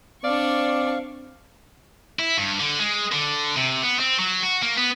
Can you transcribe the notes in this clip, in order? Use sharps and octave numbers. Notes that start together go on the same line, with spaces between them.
C4 D4 D5 F5 C#6
E4
G2
D3
G#3
D3
C3
B3
C4
F#3
F#4
A#3
B3